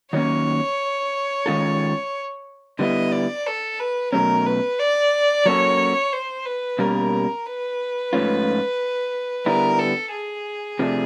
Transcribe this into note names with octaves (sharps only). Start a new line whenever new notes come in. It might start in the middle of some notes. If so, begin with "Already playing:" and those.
D#3 F#3 A#3 C#4 C#5
D#3 G#3 C#4 F4 A4
D3 G3 B3 E4 D#5
D5
A4
B4
B2 F#3 A3 C#4 A#4
B4
D5
F#3 A#3 C#4 F#4 A4 C#5
C5
B4
B2 G3 A#3 C#4 A#4
B4
G#2 F3 A3 C#4 F4
D3 G3 B3 E4 A#4
A4
G#4
C3 F3 A3 D4